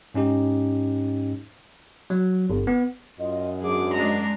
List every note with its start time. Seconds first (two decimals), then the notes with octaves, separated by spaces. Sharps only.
0.14 G#2 C#4 D#4 G4
2.10 F#3
2.50 G1
2.67 B3
3.19 F#2 F4 D#5
3.61 G#2 D3 F#3 G#4 D6
3.93 G#3 D4 A#5